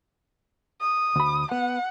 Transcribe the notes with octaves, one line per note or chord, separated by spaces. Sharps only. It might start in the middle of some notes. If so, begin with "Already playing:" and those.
D#6
D2 B5
B3 F#5